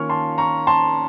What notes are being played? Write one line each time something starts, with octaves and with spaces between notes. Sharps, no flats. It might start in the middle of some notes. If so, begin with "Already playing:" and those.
Already playing: D#3 A#3 C#4 F4 C#6 F6
A5 C6
A#5 C#6
A5 C6